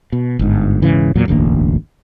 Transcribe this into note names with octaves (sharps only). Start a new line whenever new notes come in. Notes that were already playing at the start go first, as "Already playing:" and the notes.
B2
G1 G#2
E1 G#2 C#3 E3
E2 A#2 F#3
E1 A1 D2 A#3